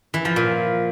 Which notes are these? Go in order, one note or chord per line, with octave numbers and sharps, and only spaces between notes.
E3
F3
A#2